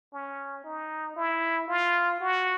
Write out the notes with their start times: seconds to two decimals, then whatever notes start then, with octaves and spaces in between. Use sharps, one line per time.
0.13 C#4
0.64 D#4
1.16 E4
1.68 F4
2.20 F#4